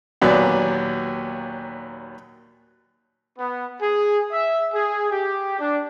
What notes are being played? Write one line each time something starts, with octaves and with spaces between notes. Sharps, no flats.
D#2 A#2 F#3 B3 D5
B3
G#4
E5
G#4
G4
D4